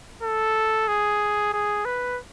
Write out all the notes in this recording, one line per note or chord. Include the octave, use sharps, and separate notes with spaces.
A4
G#4
G#4
B4